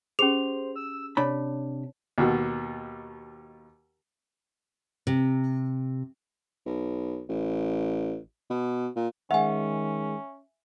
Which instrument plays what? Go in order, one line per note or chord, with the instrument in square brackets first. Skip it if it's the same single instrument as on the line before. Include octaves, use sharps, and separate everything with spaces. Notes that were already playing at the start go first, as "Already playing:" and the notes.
[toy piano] C#4 G4 G#4 [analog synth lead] C5 [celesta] F7
[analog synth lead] E6
[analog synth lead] C3 [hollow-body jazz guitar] D4 B5 [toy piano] C#5
[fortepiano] D#2 B2
[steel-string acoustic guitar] C3
[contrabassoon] B1
A1
B2
A#2
[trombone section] D#3 G#3 [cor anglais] C#4 [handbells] E5 G#5 [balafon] F#5